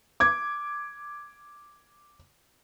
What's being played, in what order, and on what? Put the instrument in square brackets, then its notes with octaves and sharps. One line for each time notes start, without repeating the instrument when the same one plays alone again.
[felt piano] D6 G#6